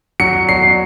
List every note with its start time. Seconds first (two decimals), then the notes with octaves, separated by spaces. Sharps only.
0.20 F#3 C#7
0.49 F#3 C7